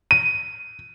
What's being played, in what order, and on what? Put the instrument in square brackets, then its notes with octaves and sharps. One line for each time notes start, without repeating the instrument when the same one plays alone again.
[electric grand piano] D#7